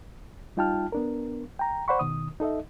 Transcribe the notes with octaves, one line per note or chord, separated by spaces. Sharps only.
G3 D#4 F4 G5 A5 F6
B3 D4 A#4
G5 A#5
C5 D5 F#5 B5 C#6
B2 D#3 D#6
D#4 A4 D#5 E5